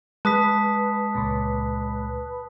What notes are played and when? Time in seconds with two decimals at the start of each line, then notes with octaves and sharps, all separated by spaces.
0.25 G#3 B4 A5 D#6 B6
1.15 C#2 A#2